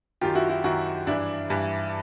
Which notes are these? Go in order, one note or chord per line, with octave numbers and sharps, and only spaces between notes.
F#2 D#3 F4 G4
E4 F#4
E4 F#4
F#2 D#3 E4 F#4
G2 E3 D4 E4
G2 E3